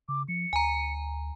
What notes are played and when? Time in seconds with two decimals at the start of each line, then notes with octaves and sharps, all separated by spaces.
0.09 C#3 D6
0.28 F3 C#7
0.53 D2 G#5 A#5